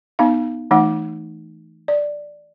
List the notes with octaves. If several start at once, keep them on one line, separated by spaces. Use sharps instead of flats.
B3 D#4 F5
E3 A3 D#4 F#5
D5